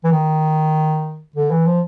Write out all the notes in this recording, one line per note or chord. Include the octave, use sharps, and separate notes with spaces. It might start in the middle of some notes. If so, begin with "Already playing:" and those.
E3
D#3
D3
E3
F3